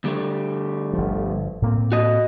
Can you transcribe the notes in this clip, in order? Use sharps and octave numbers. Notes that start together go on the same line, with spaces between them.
D2 G3 A3
G1 F3
A2 A#3 C4
F#4 D#5